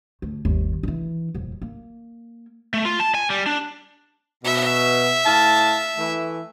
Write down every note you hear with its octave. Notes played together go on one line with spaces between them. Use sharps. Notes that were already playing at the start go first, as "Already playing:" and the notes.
D2
G1 D#2
D#3 E3
D#1 F2
A#3
A3
F4
A5
G#5
G3
D4
B2 E5
A2 F5 A5
E3 A3